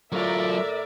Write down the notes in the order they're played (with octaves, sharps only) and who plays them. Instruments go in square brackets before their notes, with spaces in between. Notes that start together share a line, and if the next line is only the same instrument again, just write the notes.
[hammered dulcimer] A2 A#5 [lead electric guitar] F#3 F4 [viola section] A#4 D5 [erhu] E5